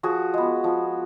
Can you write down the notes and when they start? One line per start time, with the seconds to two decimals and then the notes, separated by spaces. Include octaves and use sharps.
0.03 F3 F#4 G#4
0.34 G#3 B3
0.64 F3